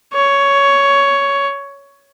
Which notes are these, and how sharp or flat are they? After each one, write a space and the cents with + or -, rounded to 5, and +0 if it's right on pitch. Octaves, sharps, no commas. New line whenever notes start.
C#5 +10